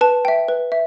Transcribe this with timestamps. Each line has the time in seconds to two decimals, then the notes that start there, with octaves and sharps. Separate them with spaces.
0.01 B4 A5
0.25 E5 G5
0.48 B4
0.72 E5